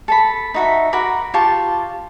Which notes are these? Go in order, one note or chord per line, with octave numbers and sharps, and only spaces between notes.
A4 A5 B5
D#4 F#4 E5
F#4 A#4 B5 D6
F4 G4 A5 C#6